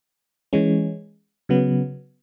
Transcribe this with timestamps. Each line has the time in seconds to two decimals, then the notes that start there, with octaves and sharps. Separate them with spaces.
0.53 E3 G#3 C#4
1.49 C#3 F#3 B3